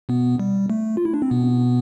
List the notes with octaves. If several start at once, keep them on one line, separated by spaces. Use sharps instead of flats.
B2 B3
G3
A3
F4
E4
D4
C4
B2 B3